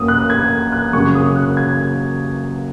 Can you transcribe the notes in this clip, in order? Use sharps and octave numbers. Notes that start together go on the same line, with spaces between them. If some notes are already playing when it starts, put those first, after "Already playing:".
Already playing: F#2 F#3 A#3 C#4 D#6
F#6
G#6
F#6
F#2 C#3 A#3 C#6
D#6
F#6
G#6